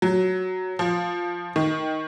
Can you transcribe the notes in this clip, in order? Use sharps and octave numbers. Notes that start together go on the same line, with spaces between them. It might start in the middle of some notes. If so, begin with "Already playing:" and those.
F#3
F3
D#3